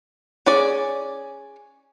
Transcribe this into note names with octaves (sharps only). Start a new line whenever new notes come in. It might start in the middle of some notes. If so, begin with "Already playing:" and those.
C#4 G#4 D5